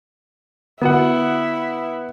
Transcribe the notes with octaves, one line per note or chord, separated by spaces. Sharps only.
D3 B3 E4 F#4 F#5